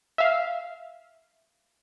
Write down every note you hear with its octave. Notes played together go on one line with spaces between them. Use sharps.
E5 F5